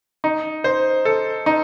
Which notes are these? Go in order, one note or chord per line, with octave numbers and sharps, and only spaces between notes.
D#4
C5
A4
D#4